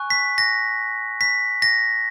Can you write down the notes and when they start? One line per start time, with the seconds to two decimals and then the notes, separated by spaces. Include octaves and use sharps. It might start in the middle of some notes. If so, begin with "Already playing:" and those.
Already playing: G#5 C#6 F#6
0.10 B6
0.38 A#6
1.21 B6
1.62 A#6